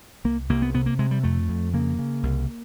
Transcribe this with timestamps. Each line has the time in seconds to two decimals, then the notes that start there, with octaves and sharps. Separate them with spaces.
0.24 C2 A#3
0.49 C2 A#3
0.62 B3
0.74 C3 B3
0.86 A#3
0.99 C3 G#3
1.11 G3
1.23 F2 A3
1.48 F2
1.74 C#3 A#3
1.99 C#3
2.23 C2